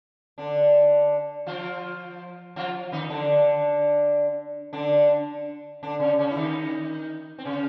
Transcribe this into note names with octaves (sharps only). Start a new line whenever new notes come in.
D3 D4
F3 F4
F3 F4
D#3 D#4
D3 D4
D3 D4
D3 D4
C#3 C#4
C#3 C#4
E4
D#3 D#4
C4
C#3 C#4